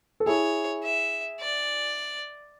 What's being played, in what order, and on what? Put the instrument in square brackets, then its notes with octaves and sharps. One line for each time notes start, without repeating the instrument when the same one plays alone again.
[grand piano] A4
[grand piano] E4 G#4 [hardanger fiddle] C#5
[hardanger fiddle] E5
D5